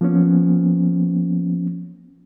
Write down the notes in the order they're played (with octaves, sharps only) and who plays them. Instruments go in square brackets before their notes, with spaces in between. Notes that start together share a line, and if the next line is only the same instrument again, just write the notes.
[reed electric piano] F3 A#3 B3 C#4